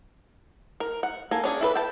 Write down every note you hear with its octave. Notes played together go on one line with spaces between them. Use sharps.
A#4
F#5
A#3 A4 G#5
C#4 D4 G#4
E4 A4 B4
G5 A5